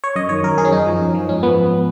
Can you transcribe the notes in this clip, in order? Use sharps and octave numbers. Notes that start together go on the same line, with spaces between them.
C#5
F#2 D#5
D#3 C#5
F#2 A#4
D#3 G#4
C#4
F#2 D#4
F3
F#2
F3
G#2 C#4
F3 B3